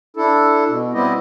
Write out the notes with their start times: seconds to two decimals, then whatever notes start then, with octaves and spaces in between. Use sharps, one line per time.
0.17 D4 E4 A4
0.69 B2
0.94 G3 B3 C4 E4 G4 D#5